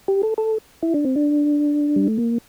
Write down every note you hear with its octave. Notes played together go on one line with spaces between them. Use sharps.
G4
A4
A4
E4
D4
C4
D4
G3
A3
A#3